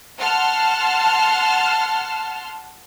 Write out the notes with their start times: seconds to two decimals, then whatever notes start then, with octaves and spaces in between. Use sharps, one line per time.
0.20 F#5 A5 C6 F6